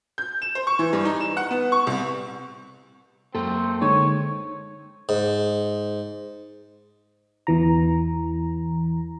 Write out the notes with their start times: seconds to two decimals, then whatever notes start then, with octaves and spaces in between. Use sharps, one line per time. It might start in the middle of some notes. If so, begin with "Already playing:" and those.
0.18 G6
0.42 E7
0.55 C5
0.67 C#6
0.79 E3
0.93 G2
1.05 D#4
1.20 E7
1.37 F#5
1.51 B3
1.72 C#6
1.87 C2
3.35 F#2 F#3 A#3 C4 A4
3.82 D3 G#3 D#4 C#5
5.09 G#2
7.47 E2 E3 A#5